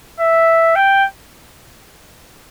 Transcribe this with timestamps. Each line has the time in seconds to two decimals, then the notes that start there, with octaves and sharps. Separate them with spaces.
0.20 E5
0.76 G5